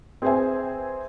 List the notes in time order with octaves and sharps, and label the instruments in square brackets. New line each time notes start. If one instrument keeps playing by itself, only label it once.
[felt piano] C4 G#4 B4 C5 E5 G#5